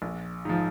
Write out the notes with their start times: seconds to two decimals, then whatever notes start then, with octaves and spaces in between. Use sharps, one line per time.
0.02 A#1
0.45 G#2 F3